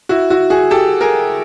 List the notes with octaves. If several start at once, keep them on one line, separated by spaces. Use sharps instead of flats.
E4 F#4
E4 F#4
F#4 G#4
G4 A4
G#4 A#4